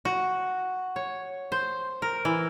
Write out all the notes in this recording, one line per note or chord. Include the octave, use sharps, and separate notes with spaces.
F#4
C#5
C5
A#4
E3